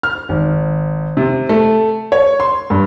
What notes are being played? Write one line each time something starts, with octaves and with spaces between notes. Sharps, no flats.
F6
G#1
C3
A3
C#5
C6
G2